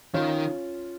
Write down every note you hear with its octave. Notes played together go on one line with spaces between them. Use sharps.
D#3 C#4 F4